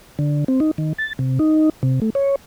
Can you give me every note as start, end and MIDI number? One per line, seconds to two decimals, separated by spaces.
0.19 0.44 50
0.48 0.60 60
0.60 0.71 63
0.78 0.93 51
0.98 1.13 93
1.19 1.39 48
1.39 1.70 63
1.83 2.00 48
2.02 2.10 57
2.15 2.36 73